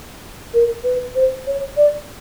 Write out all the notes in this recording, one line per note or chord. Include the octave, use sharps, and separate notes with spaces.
A#4
B4
C5
C#5
D5